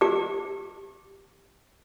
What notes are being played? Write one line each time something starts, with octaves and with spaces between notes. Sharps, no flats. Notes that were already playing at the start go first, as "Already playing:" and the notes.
G4 D6